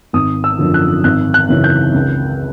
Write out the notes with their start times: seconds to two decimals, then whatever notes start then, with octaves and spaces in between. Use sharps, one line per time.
0.13 G#1 D#6
0.44 E6
0.58 F#2 D3 F3
0.74 F#6
1.04 G#1 F#6
1.34 F#6
1.49 F#2 C#3 E3
1.64 G6
1.94 C#2